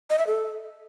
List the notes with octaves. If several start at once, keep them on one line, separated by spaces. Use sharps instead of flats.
D#5
E5
A4